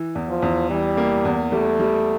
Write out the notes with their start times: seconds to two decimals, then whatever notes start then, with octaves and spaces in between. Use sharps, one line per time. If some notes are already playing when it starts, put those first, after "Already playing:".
Already playing: E3
0.15 E2
0.29 F3
0.42 E2
0.70 E3 G3
0.97 A#3
1.25 E2
1.52 G3 A3
1.79 G3